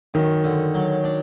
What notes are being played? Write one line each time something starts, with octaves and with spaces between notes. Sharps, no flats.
F#2 D#3
D3
F#3
D4